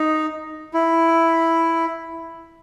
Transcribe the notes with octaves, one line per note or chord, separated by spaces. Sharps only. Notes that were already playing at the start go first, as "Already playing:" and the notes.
Already playing: D#4
E4